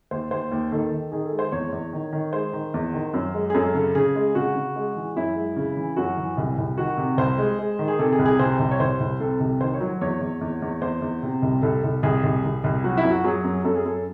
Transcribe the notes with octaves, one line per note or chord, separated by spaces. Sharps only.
D#2 C5
D#2 C5
D#2
D#3 A4
D#3
D#3 G#4
A4
G#3
C5
E2 C#5
E2
D#3
D#3
G#3 C5
D#3
E2
D#3
F#2
G#3
G#4
F#2 A4
C#3 A4
C#3 G#4
G#3
C#3 F#4
C#3
G#3
E3
F#2 E4
G#3
C#3
E3
F#2 F#4
E3
C2
C2
D#3 F#4
C3
C2 C5
G#3
G#3
D#3
G#4
C3 A4
G#4
C2
G#4
C3 C5
C2
C#5
C2 C5
C2
C3 A4
C2
D#3 C5
C#5
F#3
E2 C#5
E2
E2
E2
E2 C5
E2
C3
C2
C2 A4
C2
C2 G#4
C2
C2
C2
F#3 F#4
E4
F#2
F#4
F#3 G#4
F#2
F#2 A4
G#4
F#2 A4